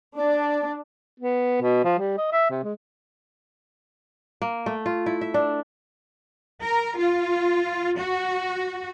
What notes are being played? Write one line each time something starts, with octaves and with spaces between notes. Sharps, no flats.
D4 D5
B3
B2
F3
G3
D#5
E5
C3
G#3
A#3
A3
F4
E4
E5
D4
A#4
F4
F#4